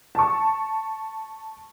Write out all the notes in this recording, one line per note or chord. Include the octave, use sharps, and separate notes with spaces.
A5 C#6